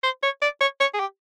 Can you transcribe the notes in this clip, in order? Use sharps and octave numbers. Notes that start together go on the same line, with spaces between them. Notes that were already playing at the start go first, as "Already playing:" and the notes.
C5
C#5
D5
C#5
C#5
G#4
G4